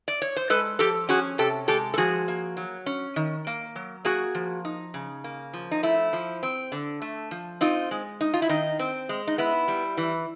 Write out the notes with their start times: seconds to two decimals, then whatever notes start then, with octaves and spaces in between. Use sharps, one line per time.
0.08 D5
0.22 C#5
0.36 C5
0.50 G#3 A4 B4
0.79 F3 G4 A4
1.09 C#4 F#4 G#4
1.38 C3 G4 A4
1.68 G#3 G4 A4
1.94 A4
1.98 F3 F#4 G#4
2.28 A#3
2.57 F#3
2.86 C#4
3.16 D#3
3.47 A#3
3.76 F#3
4.05 A#3 F#4 G#4
4.35 F3
4.65 D#4
4.94 C#3
5.24 A#3
5.53 F3
5.71 D#4
5.83 A3 E4
6.13 F3
6.43 C4
6.72 D3
7.02 A3
7.31 F3
7.61 C4 D#4 F4
7.91 G#3
8.21 D#4
8.34 F4
8.42 E4
8.49 D#3 D#4
8.79 C4
9.09 G#3
9.27 D#4
9.38 B3 E4
9.68 G3
9.97 E3